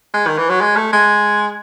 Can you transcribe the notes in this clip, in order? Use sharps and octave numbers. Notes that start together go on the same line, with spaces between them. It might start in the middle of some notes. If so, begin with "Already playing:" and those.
G#3
D#3
E3
F#3
G#3
A3
G#3